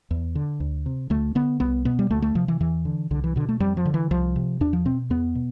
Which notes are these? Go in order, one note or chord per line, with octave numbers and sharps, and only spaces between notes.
E2
D3
D2
C3
D2 A3
D3 B3
C2 B3
B2 B3
G3
D2 A3
A3
C3 F3
E3
E2 E3
D3
C2 D3
E3
B2 D3
A3
F2 G3
F3
D3
E3
C2 F3
C3
E2 D4
F3
B2 C4
E2 B3
B2